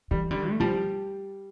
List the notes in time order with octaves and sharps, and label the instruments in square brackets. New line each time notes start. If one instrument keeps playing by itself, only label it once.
[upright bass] E3 [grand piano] G3
[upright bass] D3 [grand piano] G3
[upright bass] A3
[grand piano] F3 [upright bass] G3